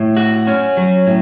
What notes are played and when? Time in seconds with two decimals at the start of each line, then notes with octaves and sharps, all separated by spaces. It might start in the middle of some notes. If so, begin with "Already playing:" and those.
Already playing: A2
0.17 F#4
0.47 C#4
0.77 F#3
1.07 A2